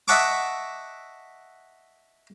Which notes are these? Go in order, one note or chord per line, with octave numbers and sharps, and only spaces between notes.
D#5 E5 F#5 A5 C#6 D6